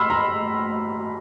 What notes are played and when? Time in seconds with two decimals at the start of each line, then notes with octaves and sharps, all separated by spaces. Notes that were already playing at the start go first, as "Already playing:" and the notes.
Already playing: B5 C6 E6 F6
0.10 A#5